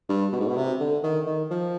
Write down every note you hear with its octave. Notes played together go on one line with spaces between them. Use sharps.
G2
B2
G#2
B2
C3
D3
D#3
D#3
F3